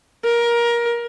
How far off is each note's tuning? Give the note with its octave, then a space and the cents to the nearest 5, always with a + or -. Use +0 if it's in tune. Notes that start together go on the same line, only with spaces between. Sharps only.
A#4 +20